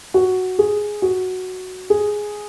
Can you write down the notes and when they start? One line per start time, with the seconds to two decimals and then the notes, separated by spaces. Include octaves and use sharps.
0.14 F#4
0.59 G#4
1.02 F#4
1.90 G#4